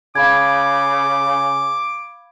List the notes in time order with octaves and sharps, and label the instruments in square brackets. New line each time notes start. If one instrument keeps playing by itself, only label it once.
[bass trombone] C#3 [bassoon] G#4 [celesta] F5 B5 G#6 [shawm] D6